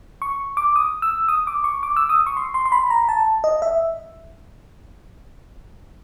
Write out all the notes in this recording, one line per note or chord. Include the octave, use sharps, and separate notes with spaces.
C#6
D6
D#6
E6
D#6
D6
C#6
D6
E6
D#6
C#6
C6
C6
C6
B5
A#5
A5
D#5
E5